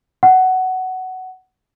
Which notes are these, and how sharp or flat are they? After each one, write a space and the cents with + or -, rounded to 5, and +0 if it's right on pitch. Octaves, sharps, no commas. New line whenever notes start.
F#5 +15